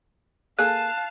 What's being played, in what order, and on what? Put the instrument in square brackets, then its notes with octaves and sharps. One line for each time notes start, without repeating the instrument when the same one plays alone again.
[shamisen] A#3 G#4 A4 [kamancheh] F5 A5 [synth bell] F#6